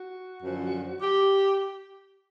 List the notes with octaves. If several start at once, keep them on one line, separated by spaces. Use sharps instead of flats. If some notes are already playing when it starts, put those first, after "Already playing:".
Already playing: F#4
F#2 D3 F3
G4